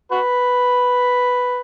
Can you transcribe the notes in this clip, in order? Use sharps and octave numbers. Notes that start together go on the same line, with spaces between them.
F#4 B4